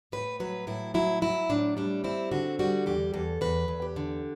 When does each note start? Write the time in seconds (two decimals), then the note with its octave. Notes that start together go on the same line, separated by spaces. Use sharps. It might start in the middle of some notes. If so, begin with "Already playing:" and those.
0.12 A2 B4
0.40 F#3 B4
0.67 A2 E4
0.94 F#3 E4
1.22 F#3 E4
1.49 A2 D4
1.77 G3 D4
2.04 C4 E4
2.32 D3 F#4
2.59 G3 F#4
2.86 E2 G4
3.14 E2 A4
3.41 E2 B4
3.68 E2
3.82 G4
3.96 D3